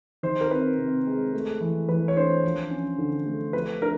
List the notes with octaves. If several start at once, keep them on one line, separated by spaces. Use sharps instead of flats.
D#3 C5
A#4
C4 B4
C3
G#3
A3
E3
E3 B4
C#5
D4 C5
F3
C#4
D3
A3
F3 B4
D4 A#4